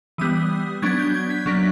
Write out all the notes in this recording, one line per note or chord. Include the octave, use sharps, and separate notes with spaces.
E3 G3 B3 D#6
F#3 B3 D4 G#6
G6
G#6
B6
F#3 A#3 D4